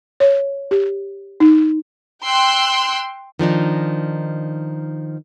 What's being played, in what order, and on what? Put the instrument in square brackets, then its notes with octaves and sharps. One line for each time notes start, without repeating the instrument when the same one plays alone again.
[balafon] C#5
G4
D#4
[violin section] G5 C6 E6 F#6
[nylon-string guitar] D#3 F3 D4 D#4